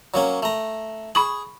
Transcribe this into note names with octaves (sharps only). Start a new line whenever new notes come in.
F#3 A#3 C#4
A3 A#5
G#4 B5 C#6 F#7